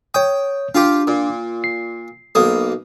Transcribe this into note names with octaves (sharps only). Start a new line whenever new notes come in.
C#5 G5 D#6
D4 F4 G4 D6
A#2
C7
B1 A#3 D#6